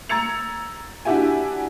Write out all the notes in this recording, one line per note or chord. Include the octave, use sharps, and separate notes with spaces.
A#5 E6 G#6 A6 C#7 F7
D4 E4 F#4 G4 E5 G#5